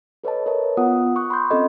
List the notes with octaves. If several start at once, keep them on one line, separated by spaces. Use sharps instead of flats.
A4 B4 C#5 D#5 A5
A#4 B4 C#5 E5 A5
B3 F4 F#5 D#6
C#6 D#6 F#6
B5 C6 G6
C4 C#4 F4 A4 D#5